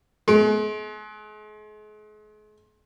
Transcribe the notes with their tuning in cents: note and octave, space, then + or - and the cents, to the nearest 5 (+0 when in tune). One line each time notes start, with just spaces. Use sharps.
G#3 +40